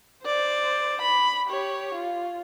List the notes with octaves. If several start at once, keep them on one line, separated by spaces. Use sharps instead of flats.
C5 D5
B5
G4 C#5
F4